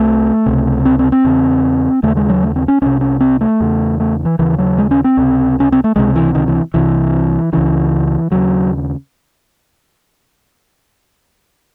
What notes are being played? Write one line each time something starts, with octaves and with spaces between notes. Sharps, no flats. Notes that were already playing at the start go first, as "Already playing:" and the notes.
Already playing: C2 C3 A3
C#2 C3
C4
C4
C4
E2 C#3
D#2 C#3 A3
G#3
F#3
A3
C4
C#4
C2 C3 C#4
C#4
C4
A3
E2 C#3
A3
E3
D#2 C#3 E3
F#3
G#3
C#4
C4
C#2 C3
C#4
C4
A3
C#2 C3 G#3
E3
D#3
E3
C2 C3 E3
C#2 C#3 E3
D#2 C#3 F#3